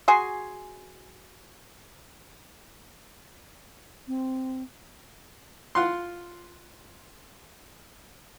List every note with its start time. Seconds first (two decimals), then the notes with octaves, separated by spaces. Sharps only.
0.08 F#4 G#4 G#5 C6
4.07 C4
5.75 F4 F#5 C6